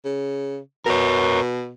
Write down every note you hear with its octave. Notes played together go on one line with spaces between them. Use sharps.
C#3
B2 A#4 C#5